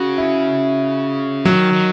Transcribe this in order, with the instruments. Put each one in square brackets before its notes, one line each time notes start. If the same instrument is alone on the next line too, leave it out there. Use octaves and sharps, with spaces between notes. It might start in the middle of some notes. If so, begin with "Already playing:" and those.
Already playing: [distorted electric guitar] C#3 [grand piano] F#4
[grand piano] E4
[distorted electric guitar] D#3 [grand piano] F#3
[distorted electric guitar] D#3